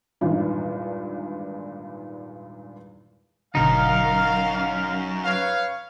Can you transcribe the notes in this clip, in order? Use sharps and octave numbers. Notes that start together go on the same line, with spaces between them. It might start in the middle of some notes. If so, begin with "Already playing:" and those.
G#1 E2 G2 A#2 D#3 E3
G1 F#2 B2 D3 D#4 A#4 F5
B4 C#5 F5